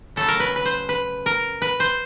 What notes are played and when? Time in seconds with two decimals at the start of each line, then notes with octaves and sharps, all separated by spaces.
0.16 C#3 F#3 A3 A4
0.28 A#4
0.40 B4
0.56 B4
0.65 C5
0.89 B4
1.26 A#4
1.62 B4
1.80 C5